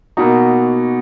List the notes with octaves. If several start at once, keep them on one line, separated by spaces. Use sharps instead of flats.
B2 A#3 D#4 F#4